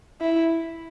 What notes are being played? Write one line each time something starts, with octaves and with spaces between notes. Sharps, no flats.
E4